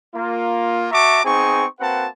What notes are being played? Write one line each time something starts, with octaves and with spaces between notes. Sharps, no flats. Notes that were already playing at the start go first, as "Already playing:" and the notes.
A#3 F4
F#4 E5 A5 A#5 C#6 D6
B3 C4 D#4 G#4 G#5 C#6
A#3 C4 F#4 B4 F#5 A5